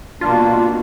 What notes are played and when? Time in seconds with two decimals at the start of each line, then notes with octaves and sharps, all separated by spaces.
0.21 B2 A#3 D4 F4